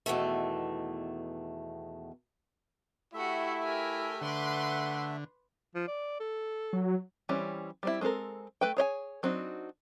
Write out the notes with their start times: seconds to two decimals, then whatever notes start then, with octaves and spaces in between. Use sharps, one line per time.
0.06 E2 B2 D#3 A3
3.14 A3 E4 F#4 G4 E5
3.63 G4 A#4 G#5
4.21 D3 B4 F#5 C6 D6
5.75 F3
5.88 D5
6.20 A4
6.73 F#3
7.29 E3 G3 C4 C#4
7.83 G3 C4 E4
8.01 G#3 C4 D4 A4 A#4
8.61 A3 B4 G5
8.77 G#4 C#5 D#5 G#5
9.23 F#3 C4 D4 D#4 F#4